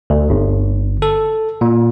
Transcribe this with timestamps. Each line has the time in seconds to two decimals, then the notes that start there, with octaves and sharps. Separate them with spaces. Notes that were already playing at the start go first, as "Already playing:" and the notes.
0.10 D2
0.30 G1
1.02 A4
1.61 A#2